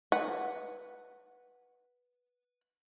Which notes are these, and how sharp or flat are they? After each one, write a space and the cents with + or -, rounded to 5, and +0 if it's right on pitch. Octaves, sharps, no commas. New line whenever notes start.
B4 -5 F#5 +0